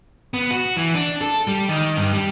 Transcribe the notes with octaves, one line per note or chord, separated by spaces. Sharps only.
B3
F#4
E3
D4
A4
G3
D#3
G2
G3